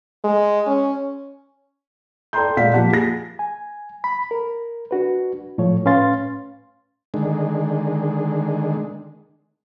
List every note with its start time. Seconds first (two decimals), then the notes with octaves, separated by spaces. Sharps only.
0.24 G#3
0.67 C#4
2.33 A4 D5 G5 A#5 C6 G6
2.57 A#2 G#3 F5 F#5 B6
2.73 F3 A#3 G4 F#5 A5
2.93 G#4 A#6
3.39 G#5
4.04 B5
4.31 A#4
4.91 D4 F#4 B4
5.58 A2 F3 C#5
5.85 A2 C#4 B4 F5 C6 A6
7.14 D3 D#3 G#3